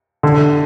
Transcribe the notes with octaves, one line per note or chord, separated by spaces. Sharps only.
D3